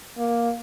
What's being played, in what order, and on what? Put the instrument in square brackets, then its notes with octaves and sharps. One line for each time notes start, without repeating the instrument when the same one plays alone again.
[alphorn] A#3